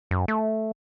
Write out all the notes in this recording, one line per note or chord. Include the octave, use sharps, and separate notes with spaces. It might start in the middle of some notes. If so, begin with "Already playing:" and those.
F#2
A3